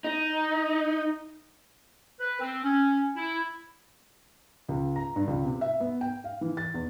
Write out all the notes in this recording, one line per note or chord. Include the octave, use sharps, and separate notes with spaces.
D#4
B4
C4
C#4
E4
C#2
A#5
G2
C#2
C3
E5
B3
G5
F5
E3
A6
E2